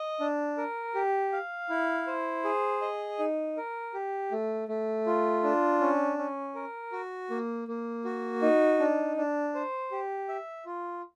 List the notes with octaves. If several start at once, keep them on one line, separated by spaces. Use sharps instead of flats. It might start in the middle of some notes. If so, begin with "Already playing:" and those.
Already playing: D#5
D4
A#4
G4
F5
E4
C5
G#4
D#5
D#4
A#4
G4
A3
A3
F4
D4
C#4
C#4
A#4
F#4
A#3
A#3
F#4
D#4
D4
D4
C5
G4
E5
F4